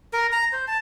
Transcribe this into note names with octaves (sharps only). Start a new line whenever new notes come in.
A#4
A#5
C5
A5